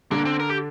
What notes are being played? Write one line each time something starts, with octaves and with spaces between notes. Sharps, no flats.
D3 A#3 D4
C4
A#4
G4